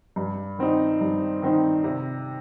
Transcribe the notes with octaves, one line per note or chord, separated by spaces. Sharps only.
G2
D#3 C4 D#4
G2
D#3 C4 D#4
C3